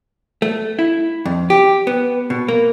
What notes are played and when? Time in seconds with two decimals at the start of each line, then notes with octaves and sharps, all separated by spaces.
0.42 A3
0.79 E4
1.26 F2
1.50 G4
1.87 B3
2.30 B2
2.48 A#3